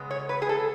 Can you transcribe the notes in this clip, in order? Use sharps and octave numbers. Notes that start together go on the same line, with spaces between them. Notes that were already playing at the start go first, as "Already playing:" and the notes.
Already playing: C#3 G#3 B3
C#5
B4
G#4
A4